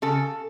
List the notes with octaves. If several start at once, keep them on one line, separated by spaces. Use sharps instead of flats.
C#3 A4